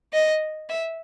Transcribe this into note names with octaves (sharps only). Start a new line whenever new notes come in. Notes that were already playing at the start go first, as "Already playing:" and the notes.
D#5
E5